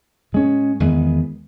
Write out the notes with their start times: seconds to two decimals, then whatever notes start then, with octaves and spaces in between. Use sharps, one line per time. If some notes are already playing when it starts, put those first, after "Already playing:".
0.32 A2 G#3 C#4
0.80 E2 D#3 G#3 B3